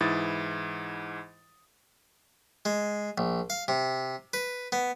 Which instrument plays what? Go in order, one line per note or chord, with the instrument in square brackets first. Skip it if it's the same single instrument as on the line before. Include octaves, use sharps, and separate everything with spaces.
[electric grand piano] G#2 E3 E4 D#6 A6
[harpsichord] G#3
A#1
F5
C3
B4
B3